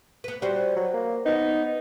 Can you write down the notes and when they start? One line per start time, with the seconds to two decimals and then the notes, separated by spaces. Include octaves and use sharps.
0.24 B3 B4
0.42 G3 F#4 C5
0.76 F#3
0.93 A#3
1.26 B3 D#4